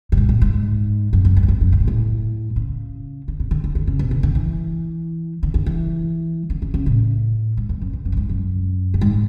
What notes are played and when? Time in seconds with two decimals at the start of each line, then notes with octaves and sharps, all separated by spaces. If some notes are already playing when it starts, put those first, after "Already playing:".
0.12 A2
0.17 G#2
0.29 A2
0.41 G#2
1.13 F#2
1.25 F#2
1.37 G#2
1.43 F#2
1.48 E2
1.61 F#2
1.72 A2
1.80 B2
1.88 A2
2.56 C#3
3.28 D3
3.40 B2
3.51 D3
3.64 D3
3.75 D3
3.87 C#3
3.99 B2
4.11 D3
4.23 D3
4.35 E3
5.43 D3
5.54 D3
5.66 E3
6.50 D3
6.62 C#3
6.74 C#3
6.86 A2
7.57 G#2
7.69 E2
7.82 F#2
7.93 E2
8.05 F#2
8.12 A2
8.17 G#2
8.29 F#2
8.94 A2
9.01 G#2